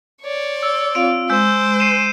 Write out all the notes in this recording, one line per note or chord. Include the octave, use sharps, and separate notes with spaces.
C#5 D5
E6
C4 F4 F5 D7
G#3 C5 E6 G6
C7 D#7 E7